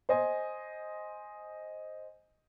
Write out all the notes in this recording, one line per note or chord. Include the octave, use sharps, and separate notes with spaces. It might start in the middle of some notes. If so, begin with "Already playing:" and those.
C5 D#5 G#5